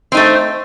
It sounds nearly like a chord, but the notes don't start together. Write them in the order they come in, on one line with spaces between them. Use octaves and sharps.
C4 D#4 A3